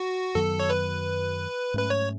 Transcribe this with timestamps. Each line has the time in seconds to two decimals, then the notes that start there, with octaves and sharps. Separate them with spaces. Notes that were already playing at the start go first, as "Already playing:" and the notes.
Already playing: F#4
0.35 F#2 D#3 F#3 B3 A4
0.60 C#5
0.70 B4
1.74 G#2 F#3 A3 C#4 B4
1.90 C#5